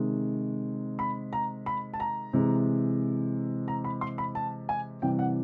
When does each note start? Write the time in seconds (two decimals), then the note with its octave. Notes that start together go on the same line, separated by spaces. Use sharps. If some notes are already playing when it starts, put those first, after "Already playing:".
Already playing: C3 D#3 G#3
0.99 B5
1.33 A#5
1.66 B5
1.94 A5
2.00 A#5
2.33 C3 E3 G#3
3.68 A#5
3.84 B5
4.01 C6
4.18 B5
4.35 A5
4.69 G#5
5.02 C3 E3 G3 G5
5.19 F#5